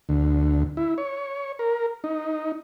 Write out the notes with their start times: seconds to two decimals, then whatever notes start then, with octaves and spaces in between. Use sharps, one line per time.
0.09 D2
0.77 E4
0.98 C#5
1.59 A#4
2.04 D#4